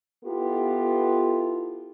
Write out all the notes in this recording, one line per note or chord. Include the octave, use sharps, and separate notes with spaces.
B3 E4 F4 G4 A4